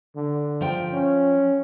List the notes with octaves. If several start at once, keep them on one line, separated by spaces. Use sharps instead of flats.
D3
F3 G5
C#4